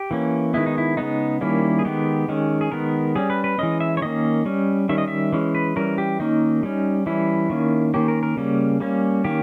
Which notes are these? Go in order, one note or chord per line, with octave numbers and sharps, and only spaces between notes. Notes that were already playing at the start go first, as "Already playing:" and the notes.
Already playing: G4
E3 A#3 C#4
D#3 G#3 B3 E4
D#4
E4
C#3 G#3 B3 D#4
D#3 G3 A#3 C#4 E4
G#4
D#3 G#3 B3 G4
D#3 G#3 C#4
G#4
D#3 G#3 B3 A#4
G3 C#4 G#4
B4
B4
E3 G#3 C#4 D#5
E5
C#5
D#3 A#3 C#4 D#5
G3 C#4
D#3 G3 C#4 E5
D#5
E5
E3 G#3 C#4
B4
E3 G3 C#4 A#4
G4
D#3 A#3 C#4 D#4
G3 C#4
E3 G3 C#4 E4
D#3 A#3 C#4
D#3 A#3 C#4 G4
A#4
A#4
C#3 G3 A#3 C#4
G3 A#3 C#4
D#3 A#3 C#4 G4